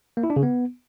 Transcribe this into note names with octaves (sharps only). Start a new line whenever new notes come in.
A#3
E4
D4
C#3
B3